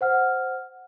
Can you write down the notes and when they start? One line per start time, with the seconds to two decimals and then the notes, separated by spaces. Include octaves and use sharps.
0.01 C5 F#5 F6